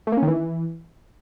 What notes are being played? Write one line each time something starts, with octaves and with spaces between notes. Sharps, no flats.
A3
A#3
C#4
D#3
E3